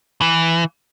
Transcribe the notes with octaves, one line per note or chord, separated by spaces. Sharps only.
E3